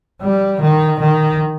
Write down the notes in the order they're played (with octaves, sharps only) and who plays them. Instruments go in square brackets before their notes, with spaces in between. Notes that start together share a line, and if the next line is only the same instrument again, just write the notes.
[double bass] G3
D#3
D#3